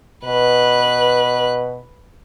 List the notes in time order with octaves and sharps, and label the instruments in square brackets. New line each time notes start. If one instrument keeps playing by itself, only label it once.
[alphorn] B2 [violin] B4 F#6